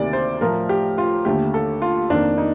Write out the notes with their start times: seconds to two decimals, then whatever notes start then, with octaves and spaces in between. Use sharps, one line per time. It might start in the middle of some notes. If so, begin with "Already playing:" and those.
Already playing: D2 C3 D#3 A#3 D5
0.13 C5
0.41 A2 F3 A3 A#4
0.69 G4
0.98 F4
1.25 D#2 D3 A3 G4
1.54 A4
1.82 F4
2.10 F2 D#3 A#3 D4
2.38 D#4